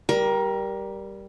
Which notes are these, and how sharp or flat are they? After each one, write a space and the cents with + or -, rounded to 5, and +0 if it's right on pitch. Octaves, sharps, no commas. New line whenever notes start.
G3 +0 A#4 +20